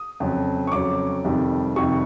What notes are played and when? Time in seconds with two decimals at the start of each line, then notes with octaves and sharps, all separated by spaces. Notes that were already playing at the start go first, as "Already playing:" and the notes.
Already playing: D#6
0.20 F2 C#3 F#3
0.67 C#6
0.72 F2 C#3 F#3 D6
1.25 F2 C3 D#3 G3
1.76 F2 C3 D#3 G3 C#6